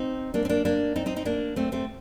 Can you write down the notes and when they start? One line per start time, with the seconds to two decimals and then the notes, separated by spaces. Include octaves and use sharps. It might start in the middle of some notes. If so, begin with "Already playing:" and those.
Already playing: C4 D#4
0.34 A#3 D4
0.45 C4
0.49 A#3 D4
0.65 A#3 D4
0.96 C4 D#4
1.06 C4 D#4
1.16 C4 D#4
1.25 A#3 D4
1.56 A3 C4
1.72 A3 C4